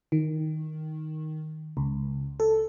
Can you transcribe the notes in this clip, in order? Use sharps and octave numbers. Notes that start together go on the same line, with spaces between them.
D#3
C#2
A4